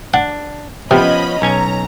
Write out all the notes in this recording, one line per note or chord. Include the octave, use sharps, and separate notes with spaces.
D4 F#5
C3 F3 B3 C#4 D#5 B5
B1 C#4 G#5 A#5